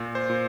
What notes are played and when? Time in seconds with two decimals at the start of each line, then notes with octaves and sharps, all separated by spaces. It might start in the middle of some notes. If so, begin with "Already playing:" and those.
Already playing: A#2
0.15 C5
0.30 A#2